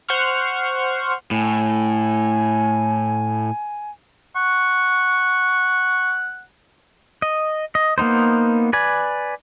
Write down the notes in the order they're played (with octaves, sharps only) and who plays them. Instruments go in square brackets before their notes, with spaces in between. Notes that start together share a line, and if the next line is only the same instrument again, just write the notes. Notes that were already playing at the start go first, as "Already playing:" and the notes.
[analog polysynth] C5 F#5 C6 C#6 F6
[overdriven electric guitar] A2 [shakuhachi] G#5
[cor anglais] F#5 [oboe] C#6
[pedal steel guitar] D#5
D#5
A#3 B3 D#4 C5
B4 D5 G#5